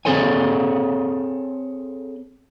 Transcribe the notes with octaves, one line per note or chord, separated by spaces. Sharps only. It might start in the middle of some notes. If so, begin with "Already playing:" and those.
C4 G#4 A4 C5 C#5 G#5